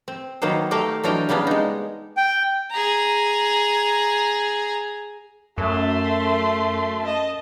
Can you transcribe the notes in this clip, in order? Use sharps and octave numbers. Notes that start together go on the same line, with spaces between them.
C4
D#3 F#3 A#3 B3 C5
A3 A#3 G4 A#4 F5 G5
E3 F#3 D4 A#4 D#5 G5
C#3 G3 A#3 B3 D4
G#3 D#4
G5
G#4 A#5
F#2 A3 C6
D#5 A5